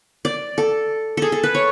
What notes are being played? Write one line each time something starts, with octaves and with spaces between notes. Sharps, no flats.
D5
A4
G#4 A4
A4
B4
C#5